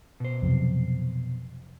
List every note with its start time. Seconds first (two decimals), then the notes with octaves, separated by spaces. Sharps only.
0.20 B2 C5
0.42 F2 C3 F#3